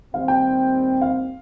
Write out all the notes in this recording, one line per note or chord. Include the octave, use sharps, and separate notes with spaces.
D#2 D#3 G3 C4 F5
G5
F5